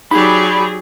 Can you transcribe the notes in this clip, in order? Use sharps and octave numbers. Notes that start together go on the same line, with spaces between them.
F#3 D#4 G4 G#4 D5 B5